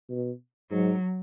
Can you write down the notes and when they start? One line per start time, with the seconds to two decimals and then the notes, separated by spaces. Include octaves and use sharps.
0.10 B2
0.71 G#2 F#3